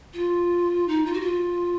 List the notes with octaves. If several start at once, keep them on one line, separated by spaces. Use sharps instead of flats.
F4
D#4
F4
F#4
F4